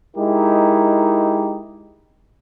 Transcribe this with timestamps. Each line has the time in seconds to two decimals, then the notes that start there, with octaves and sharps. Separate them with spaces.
0.17 G#3 D#4 E4 G4 A#4